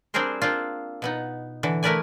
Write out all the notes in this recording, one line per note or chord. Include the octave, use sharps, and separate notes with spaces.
G3 C4 D4 G#4 A#4 C5
A#3 C4 D4 F4
B2 B3 D#4
D3 E3
A3 E4 A#4 B4 D5 G#5